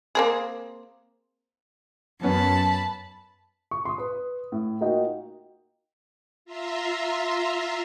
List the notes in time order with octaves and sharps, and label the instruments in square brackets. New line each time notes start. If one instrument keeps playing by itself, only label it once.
[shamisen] A#3 C4 G#4
[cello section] F#2 [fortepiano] B3 C#4 [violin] A5 B5
[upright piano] C#6
C6 D#6
B4
A2
A#3 D#4 F4 F#4 D#5 G5
[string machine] F4 E5 A#5 C6